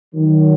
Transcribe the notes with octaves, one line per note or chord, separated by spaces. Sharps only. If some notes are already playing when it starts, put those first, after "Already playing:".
D#3 F#3